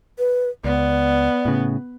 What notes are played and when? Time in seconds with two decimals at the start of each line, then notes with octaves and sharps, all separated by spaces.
0.19 B4
0.64 C#2 B3 D5
1.45 A2 C#3